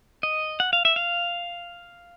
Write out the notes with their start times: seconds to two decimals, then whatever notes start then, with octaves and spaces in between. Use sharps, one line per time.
0.23 D#5
0.60 F#5
0.73 F5
0.85 E5
0.96 F5